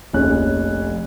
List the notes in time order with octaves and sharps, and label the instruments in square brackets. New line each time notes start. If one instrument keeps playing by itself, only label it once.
[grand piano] F1 A#1 C#4 F#6